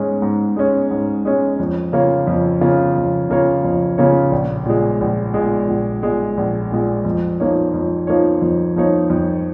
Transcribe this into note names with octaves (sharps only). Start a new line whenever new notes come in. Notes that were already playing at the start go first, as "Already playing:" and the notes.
Already playing: G#2 G#3 C#4
G#2
G#3 C#4
G#2
G#3 C#4
F2
C#3 A#3 F4 C#5
F2
C#3 A#3 F4 C#5
F2
C#3 A#3 F4 C#5
F2
C#3 A#3 F4 C#5
A#1
A#2 G#3
A#1
A#2 G#3
A#1
A#2 G#3
A#1
A#2 G#3
F2
F3 A#3 D#4 C#5
F2
F3 A#3 D#4 C#5
F2
F3 A#3 D#4 C#5
F2